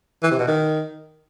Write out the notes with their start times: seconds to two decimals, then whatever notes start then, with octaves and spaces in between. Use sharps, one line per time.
0.23 E3
0.31 C3
0.39 B2
0.47 D#3